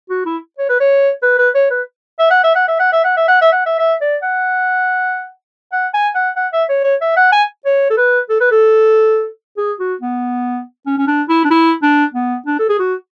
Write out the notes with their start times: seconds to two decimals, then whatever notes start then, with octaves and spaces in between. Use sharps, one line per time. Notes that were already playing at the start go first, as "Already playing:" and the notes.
0.10 F#4
0.26 E4
0.58 C#5
0.69 B4
0.80 C#5
1.22 B4
1.38 B4
1.55 C#5
1.70 B4
2.19 E5
2.30 F#5
2.44 E5
2.55 F#5
2.68 E5
2.80 F#5
2.92 E5
3.04 F#5
3.17 E5
3.28 F#5
3.41 E5
3.52 F#5
3.66 E5
3.79 E5
4.01 D5
4.22 F#5
5.72 F#5
5.94 G#5
6.15 F#5
6.36 F#5
6.53 E5
6.69 C#5
6.84 C#5
7.01 E5
7.17 F#5
7.32 G#5
7.65 C#5
7.90 A4
7.97 B4
8.29 A4
8.40 B4
8.51 A4
9.57 G#4
9.80 F#4
10.01 B3
10.86 C#4
10.98 C#4
11.07 D4
11.29 E4
11.44 D4
11.50 E4
11.82 D4
12.14 B3
12.46 D4
12.59 A4
12.69 G#4
12.79 F#4